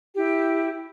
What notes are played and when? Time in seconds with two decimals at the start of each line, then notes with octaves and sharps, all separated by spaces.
0.15 E4 G4